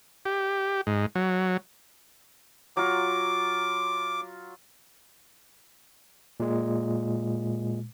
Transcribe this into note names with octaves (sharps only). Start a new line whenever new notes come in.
G4
G#2
F#3
F#3 F4 D6
A#2 G#3